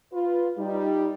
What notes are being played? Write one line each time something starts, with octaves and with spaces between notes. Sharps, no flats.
F4 B4
G3 D#4